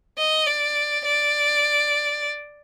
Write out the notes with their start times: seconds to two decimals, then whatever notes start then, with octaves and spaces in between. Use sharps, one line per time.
0.18 D#5
0.47 D5
1.05 D5